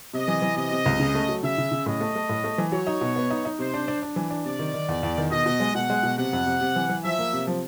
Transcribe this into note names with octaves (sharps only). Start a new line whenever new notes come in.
C3 D#5
E3
E3
C3 D#5
C3
C#2
C#3
A3
F#3
C#3 E5
C#3
C#3
A2 D#5
A3
A3
A2
A3
E3
F#3 C#5
D#4
B2
B3
D#4
D#4
C3 C5
D4
D4
D4
E3
D4
C3 D5
D#3
D#3
E2
E2
D#3
B2 D#5
B2
G#3
B2 F#5
G#3
B2
C3 F#5
F2
C3
C3
E3
E3
F3 E5
A#3
C3
F3